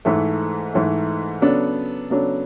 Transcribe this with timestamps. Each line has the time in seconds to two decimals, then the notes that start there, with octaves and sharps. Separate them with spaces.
0.05 G#2 E3 A3
0.73 G#2 E3 A3
1.41 C#3 F#3 B3 D4 A4
2.10 C#3 F#3 B3 D4 A4